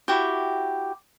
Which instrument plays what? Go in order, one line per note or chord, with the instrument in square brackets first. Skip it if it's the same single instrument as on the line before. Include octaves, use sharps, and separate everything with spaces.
[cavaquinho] E4 F#4 G4